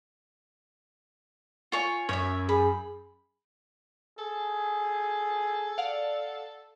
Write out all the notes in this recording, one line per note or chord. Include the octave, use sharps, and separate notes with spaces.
F4 C#5 G#5
F#2 C#5 E5
G#4 B5
G#4 A4
D5 F5 F#5